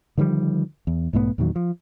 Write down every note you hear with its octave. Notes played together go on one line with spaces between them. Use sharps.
D3 D#3 F3 G3
E2
B1 G#2 A3 B3
E2 A#2 D#3 F#3
F3